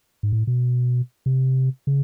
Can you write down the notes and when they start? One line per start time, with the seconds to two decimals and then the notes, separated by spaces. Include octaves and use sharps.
0.23 G#2
0.33 A2
0.47 B2
1.26 C3
1.87 C#3